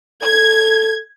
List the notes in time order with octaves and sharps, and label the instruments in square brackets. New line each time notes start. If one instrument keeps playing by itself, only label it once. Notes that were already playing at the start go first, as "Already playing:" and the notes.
[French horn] A4 [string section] G#6